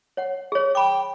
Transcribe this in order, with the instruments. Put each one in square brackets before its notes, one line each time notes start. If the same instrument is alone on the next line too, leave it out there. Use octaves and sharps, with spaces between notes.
[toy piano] C#5 F#5
G#4 C#5
[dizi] G5 [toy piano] B5 D6